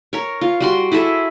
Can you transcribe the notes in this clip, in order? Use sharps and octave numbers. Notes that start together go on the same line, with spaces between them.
A#4 C#5
F4
G3 F#4 C6
E4 G#4 A4 E5